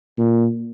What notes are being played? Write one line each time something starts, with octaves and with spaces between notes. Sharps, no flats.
A#2